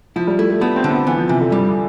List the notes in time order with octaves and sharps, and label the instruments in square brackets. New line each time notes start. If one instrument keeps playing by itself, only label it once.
[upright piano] F3 [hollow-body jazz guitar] E4
[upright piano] G3
[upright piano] A3 [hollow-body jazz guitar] E4
[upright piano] A3
[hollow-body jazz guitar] A3 [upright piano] B3
[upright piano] C4
[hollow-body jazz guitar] D3
[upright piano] B3
[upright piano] E3 [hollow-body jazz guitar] B3
[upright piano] F3
[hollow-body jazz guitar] C3 [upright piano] E3
[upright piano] D3
[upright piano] G2 [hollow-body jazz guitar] G3